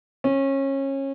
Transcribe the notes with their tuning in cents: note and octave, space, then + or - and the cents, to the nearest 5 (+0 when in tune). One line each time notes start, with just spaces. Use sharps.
C#4 -25